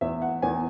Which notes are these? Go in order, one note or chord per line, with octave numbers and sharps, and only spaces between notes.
E2 E5
F#5
E2 G#5